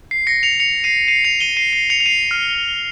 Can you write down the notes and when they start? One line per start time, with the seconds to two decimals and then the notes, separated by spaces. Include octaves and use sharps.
0.11 C7
0.27 A#6 C#7
0.43 C#7 F7
0.60 C#7 F7
0.84 C7 D#7
1.08 C7 D#7
1.24 C#7 F7
1.40 D#7 G7
1.57 C7 D#7
1.73 C7
1.90 C#7 F7
2.00 F7
2.06 C7 D#7
2.31 F6